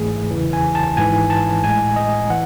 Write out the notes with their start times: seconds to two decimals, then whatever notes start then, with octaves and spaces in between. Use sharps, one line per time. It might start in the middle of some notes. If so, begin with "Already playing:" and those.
Already playing: G#1 G#2 E3 A3 G#4
0.31 E2 C#3 E3
0.53 G#5
0.75 A5
0.97 G#1 G#2 E3 G#5
1.30 A5
1.64 A1 A2 G#3 G#5
1.96 D#5
2.30 E3 F#5